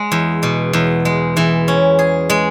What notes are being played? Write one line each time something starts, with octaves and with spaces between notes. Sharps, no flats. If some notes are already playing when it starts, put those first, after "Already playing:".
Already playing: G#3
E2
B2
E2
G#3
E3
C#4
G#4
G#3